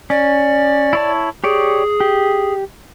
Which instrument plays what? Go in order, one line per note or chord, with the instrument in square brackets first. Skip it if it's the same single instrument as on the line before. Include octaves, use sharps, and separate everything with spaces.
[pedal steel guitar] C#4 [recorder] D5
[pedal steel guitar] E4 C#5 A5
[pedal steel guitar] G4 C#5 D5 [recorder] G#4
[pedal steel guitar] G4